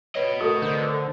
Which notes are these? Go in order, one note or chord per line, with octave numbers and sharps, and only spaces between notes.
B4 C#5 D#5
A3 F#4 A#4 D#6
D3 C5